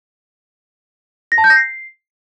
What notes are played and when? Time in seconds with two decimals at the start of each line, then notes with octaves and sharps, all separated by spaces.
1.32 A#6
1.38 A5
1.44 G6
1.50 A#6
1.56 C7